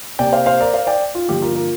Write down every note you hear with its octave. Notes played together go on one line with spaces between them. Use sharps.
C3 A#3 D5 G5
C5 F5
C5 F5
A#4 D5
C5 F5
D5 G5
F4
G2 D3 F3 A#3 G4
F4 A#4
F4 A#4